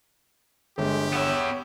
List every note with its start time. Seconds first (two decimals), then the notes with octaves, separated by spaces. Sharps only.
0.78 G1 D3 G#3 G4
1.13 B3 C#5 E5